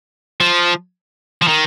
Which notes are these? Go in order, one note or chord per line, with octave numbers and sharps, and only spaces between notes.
F3
F3
D#3